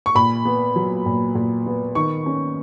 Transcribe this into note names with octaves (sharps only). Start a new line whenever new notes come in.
C#6
A#2 B5
B3
F#3
A#2
A#2
B3
D#3 C#6
C#4